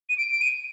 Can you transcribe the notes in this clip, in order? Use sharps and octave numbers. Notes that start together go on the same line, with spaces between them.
D#7
D7
D7
D#7